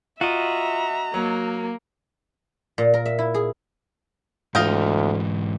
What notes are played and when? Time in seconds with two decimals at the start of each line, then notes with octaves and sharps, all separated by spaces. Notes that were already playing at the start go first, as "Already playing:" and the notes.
0.21 F4 F#4 D#5 E5 A#5
1.14 F#3 A#3
2.78 A#2
2.94 A#4
3.06 E5
3.19 E4
3.34 G#4
4.55 D2 G#2 E3 F4 D#5 G5